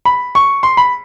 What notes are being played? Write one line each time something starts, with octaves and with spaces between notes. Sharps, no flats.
B5
C#6
C6
B5